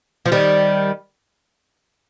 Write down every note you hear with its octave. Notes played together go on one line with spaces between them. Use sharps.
F3
D#3 G3